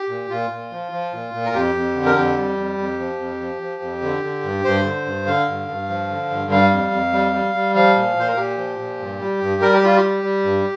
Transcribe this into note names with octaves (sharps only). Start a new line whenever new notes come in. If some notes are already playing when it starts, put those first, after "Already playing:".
Already playing: G4
A#2
A#2 F4
A#2
F3
F3
A#2
A#2
A#4
F2 G4
F2
D3
A#4
F2 G4
G3
F2
F2
F3
F2
F3
F3
F2
D3
D3
G2
G2 C5
D3
G2
D3 F5
G2
G2
F3
D3
G2
G3 F5
F2
F2
G3
G3
G3
F3 F5
A#2
A#2 C5
A#4
A#2 G4
F3
A#2
G2
G3
G2
G3 A#4
G4
G3 F4
G4
G3
G3
G2